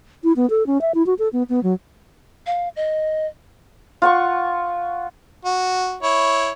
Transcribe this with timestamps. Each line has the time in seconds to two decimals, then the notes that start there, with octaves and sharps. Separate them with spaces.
0.24 E4
0.36 B3
0.50 A4
0.67 C#4
0.81 E5
0.95 E4
1.06 F#4
1.19 A4
1.33 B3
1.49 B3
1.63 F#3
2.46 F5
2.76 D#5
4.02 F4 F#5 C#6
5.45 F#4
6.03 E4 C#5